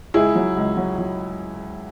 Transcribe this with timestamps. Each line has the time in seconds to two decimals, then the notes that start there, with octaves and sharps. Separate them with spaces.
0.14 C#2 E4 G#4
0.35 F#3
0.57 C#2
0.77 F#3
0.99 F#3